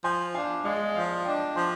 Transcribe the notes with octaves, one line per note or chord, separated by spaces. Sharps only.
F3 G#5 C6
D4 F5 G#5
G#3 D5 F5
F3 D5 F5
D4 D#5 G5
F3 G#5 C6